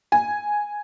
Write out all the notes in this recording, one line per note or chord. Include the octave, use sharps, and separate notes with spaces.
G#5